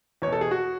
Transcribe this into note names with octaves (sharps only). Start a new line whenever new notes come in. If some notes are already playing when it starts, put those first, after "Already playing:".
E2 B2 C#5
A4
G#4
F#4